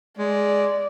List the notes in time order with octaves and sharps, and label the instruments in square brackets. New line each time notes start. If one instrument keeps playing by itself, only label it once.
[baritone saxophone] G#3 [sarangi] D5